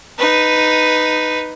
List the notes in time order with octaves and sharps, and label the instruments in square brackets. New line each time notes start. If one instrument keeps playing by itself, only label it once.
[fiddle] D#4 B4